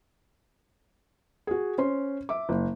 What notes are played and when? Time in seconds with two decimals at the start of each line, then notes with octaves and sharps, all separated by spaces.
1.47 F#4 G#4
1.78 C#4 C5 C6
2.29 E5 D6
2.49 F#1